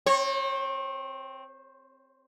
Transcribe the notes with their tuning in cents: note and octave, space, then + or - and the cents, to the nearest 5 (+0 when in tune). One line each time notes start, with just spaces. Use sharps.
C4 +0 C#5 -35